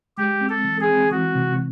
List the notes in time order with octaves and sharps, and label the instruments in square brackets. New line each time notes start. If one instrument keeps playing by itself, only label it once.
[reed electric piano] G#3 [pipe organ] G4
[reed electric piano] C4
[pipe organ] A4
[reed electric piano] E3
[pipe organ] G#4
[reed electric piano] C4
[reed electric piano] E3 [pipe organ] F#4
[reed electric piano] C3